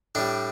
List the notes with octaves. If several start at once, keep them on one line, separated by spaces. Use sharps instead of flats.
A2 G3 D4